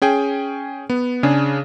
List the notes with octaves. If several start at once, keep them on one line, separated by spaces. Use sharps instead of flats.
C#4 G#4 G5
B3
C#3 D4 G#4